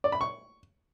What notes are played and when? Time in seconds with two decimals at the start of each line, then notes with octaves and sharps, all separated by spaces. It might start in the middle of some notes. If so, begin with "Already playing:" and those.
0.04 D5
0.12 B5
0.21 C#6